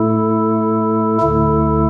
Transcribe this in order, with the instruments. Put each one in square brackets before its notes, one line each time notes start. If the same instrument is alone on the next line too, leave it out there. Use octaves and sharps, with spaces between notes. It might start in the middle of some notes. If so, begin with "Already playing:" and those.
Already playing: [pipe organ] A2 A3 E4 A4
D2 D3 A3 E4 A4